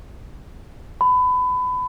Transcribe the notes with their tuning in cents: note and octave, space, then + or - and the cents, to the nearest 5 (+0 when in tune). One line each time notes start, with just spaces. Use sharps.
B5 +25